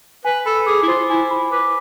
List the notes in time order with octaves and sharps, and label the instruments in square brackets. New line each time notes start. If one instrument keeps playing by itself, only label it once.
[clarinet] B4 [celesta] G#5
[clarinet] A4 [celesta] B5
[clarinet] G#4 [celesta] D6
[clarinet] E4
[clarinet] F4 [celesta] C5
[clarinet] E4 [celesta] G#5
[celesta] B5
[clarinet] B4 [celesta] D6